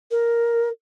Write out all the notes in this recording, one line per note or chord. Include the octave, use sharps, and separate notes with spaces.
A#4